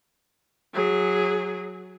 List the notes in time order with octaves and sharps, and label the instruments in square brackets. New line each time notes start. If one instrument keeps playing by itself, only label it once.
[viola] F#3 G#4